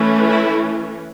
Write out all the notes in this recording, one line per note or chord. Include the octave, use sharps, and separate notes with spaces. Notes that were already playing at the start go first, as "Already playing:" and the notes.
Already playing: E3 A3 C#4
E4